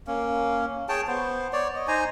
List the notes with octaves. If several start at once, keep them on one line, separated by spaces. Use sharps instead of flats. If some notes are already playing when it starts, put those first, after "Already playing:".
A#3 C#4
G#4 C#5 G5 A5
B3 C5
C#5 D5
D#5
D#4 C5 G#5 A#5